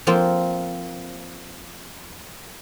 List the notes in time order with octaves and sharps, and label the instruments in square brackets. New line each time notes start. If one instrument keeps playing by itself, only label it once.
[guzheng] F3 A#3 C4 F4